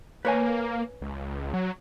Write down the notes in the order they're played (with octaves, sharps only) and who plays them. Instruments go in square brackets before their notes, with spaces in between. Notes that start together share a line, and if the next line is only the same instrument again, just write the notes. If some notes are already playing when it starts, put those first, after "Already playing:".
[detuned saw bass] A#3 [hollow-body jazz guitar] B4 C#5 G#5
[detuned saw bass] C#2
F#3